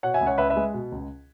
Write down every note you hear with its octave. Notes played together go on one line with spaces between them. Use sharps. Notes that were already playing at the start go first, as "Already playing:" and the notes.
B2 C#5 F#5
E5 G#5
C#2
C#5 F#5
C#2 B4 E5
B4 E5
G#3
B2
C#2